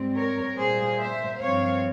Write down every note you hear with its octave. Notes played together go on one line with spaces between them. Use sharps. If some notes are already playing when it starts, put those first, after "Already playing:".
Already playing: G#2 G3 C4
A#4 C#5
A#2 G3 A#3 G#4 C5
C5 E5
G2 F3 C4 C#5 F5